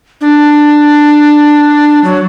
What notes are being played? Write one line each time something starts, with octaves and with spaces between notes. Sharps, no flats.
D4
F#3